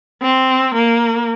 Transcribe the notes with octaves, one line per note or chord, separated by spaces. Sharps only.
C4
A#3